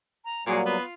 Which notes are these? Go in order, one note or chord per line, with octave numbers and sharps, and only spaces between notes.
A#5
A#2 F#3 G3 A#3 F4 F#4 G#4
B3 F4